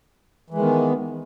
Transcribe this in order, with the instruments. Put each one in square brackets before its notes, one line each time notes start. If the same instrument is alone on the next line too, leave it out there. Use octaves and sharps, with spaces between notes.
[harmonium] E3
G#3
D#3
B3